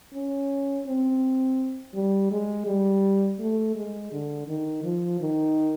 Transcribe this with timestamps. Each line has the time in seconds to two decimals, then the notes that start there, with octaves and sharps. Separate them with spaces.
0.14 C#4
0.87 C4
1.94 G3
2.31 G#3
2.66 G3
3.40 A3
3.75 G#3
4.12 D3
4.48 D#3
4.84 F3
5.20 D#3